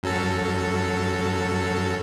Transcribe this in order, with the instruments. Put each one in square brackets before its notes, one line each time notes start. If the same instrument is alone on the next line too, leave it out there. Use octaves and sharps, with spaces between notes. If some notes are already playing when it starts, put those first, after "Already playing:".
[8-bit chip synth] F#2 F#3 A4